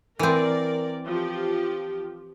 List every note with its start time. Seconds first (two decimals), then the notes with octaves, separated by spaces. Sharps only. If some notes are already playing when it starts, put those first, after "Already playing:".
0.19 E3 C4 A#4 D5
1.06 F3 G4